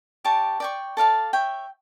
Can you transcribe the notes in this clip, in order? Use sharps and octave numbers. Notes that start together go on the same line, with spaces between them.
G4 D5 A5 C#6
D5 G5 C#6
A4 D5 F5 A5
C#5 E5 G5